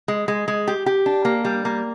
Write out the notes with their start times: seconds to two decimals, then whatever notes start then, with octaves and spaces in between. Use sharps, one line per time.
0.08 G#3
0.28 G#3
0.48 G#3
0.68 G4
0.86 G4
1.06 D4
1.25 A#3
1.45 G3
1.65 A#3